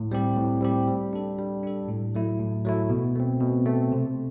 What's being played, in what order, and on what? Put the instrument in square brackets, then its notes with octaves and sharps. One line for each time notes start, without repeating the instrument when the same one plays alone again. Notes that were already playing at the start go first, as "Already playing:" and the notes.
Already playing: [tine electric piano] A2
G3 C4 G4
A2
G3 C4 G4
G3
D4 A4
G3
D4 A4
A2
F#3 A3 E4
A2
F#3 A3 E4
B2
A3 C4
B2
A3 C4
C3